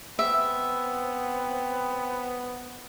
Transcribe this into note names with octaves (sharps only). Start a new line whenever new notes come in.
B3 C4 E5